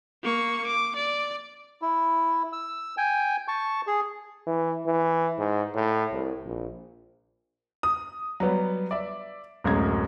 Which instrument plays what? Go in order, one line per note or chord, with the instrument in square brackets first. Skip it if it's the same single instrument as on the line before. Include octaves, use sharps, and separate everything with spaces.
[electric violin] A#3 C#6
D6
D5
[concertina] E4
E6
G5 G#5
A5 C#6
G#4
[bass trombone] E3
E3
G#2
A2
C2
A#1
[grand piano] D#6
F#3 G3 B3
D5 E5
D1 F#2 G#3 A#5 G#6